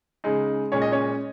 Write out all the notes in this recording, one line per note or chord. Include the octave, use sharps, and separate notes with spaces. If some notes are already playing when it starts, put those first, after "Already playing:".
C#3 G#3 D#4
A#2 G#3 C#4 C#5
D#5
C#4 C#5